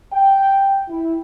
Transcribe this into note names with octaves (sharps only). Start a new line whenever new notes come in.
G5
E4